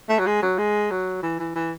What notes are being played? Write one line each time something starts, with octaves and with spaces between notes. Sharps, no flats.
A3
F#3
G#3
F#3
G#3
F#3
E3
E3
E3